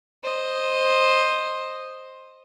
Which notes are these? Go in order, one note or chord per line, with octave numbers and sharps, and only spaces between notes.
C5 D#5